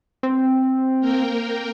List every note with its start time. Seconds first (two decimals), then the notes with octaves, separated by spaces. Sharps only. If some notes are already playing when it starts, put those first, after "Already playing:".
0.23 C4
1.01 A#3 A#4 G5